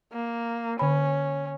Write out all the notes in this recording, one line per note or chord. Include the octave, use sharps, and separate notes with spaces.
A#3
D3 C#4 B5